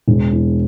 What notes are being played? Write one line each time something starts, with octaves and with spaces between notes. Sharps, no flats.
E1
E2